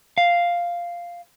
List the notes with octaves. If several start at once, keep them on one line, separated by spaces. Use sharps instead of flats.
F5